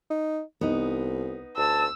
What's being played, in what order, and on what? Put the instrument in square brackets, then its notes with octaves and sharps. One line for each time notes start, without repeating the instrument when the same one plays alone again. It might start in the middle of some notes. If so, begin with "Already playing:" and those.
[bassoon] D#4
[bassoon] C2 [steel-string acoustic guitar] B3 D#4
[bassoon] D2 [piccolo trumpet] A5 [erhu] E6